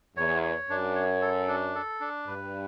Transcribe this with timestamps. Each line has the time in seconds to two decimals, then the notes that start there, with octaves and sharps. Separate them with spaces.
0.17 E2 C#5
0.43 C#5
0.69 F#2 D4
0.95 C#5
1.22 A4
1.48 D4
1.75 A4
2.00 D4
2.27 G2 B4